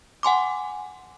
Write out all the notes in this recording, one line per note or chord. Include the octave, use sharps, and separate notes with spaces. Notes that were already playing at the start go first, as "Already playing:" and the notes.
F#5 G#5 C6 D6